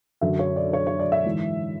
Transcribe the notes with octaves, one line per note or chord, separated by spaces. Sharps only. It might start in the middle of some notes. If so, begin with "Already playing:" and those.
F#2 D3 F#3 E5
C#5
D5
C#5
C#5
D5
E5
G#2 E3